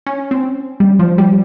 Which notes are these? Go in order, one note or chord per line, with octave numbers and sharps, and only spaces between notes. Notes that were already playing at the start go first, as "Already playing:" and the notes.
C#4
C4
G3
F3
G3